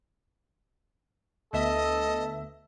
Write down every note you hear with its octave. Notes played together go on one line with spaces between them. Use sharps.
D2 B3 A4 D#5 E5